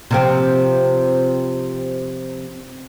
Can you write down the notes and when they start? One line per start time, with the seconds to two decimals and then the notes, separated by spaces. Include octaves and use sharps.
0.11 C3 F3 C4